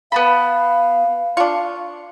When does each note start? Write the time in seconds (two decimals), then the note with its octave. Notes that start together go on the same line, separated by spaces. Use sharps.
0.12 B3 F5 A5 B5
1.37 D4 F4 C#6